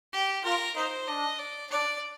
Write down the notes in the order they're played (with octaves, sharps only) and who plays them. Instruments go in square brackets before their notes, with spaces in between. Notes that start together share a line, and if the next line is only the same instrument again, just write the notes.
[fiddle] G4
[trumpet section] F4 [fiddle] A#4
[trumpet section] D#4 [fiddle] C5
[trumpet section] D4 [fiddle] D#5
[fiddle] D5
[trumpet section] D4 [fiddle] D5